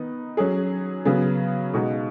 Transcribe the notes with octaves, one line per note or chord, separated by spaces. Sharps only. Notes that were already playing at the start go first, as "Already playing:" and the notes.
Already playing: D#3 B3 D#4
F#3 C#4 G#4
C#3 F#3 B3 G#4
B2 G#3 D#4 F#4